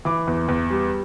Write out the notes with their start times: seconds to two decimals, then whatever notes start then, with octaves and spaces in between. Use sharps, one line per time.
0.05 E3 D6
0.27 E2
0.48 E2
0.70 G3